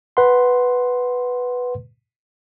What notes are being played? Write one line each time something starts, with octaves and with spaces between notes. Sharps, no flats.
B4 F#5 C6